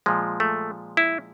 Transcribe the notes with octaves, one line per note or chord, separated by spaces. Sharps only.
A#2 F3 G#3
A3
E4